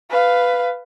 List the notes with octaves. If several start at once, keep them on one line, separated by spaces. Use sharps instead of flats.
B4 F5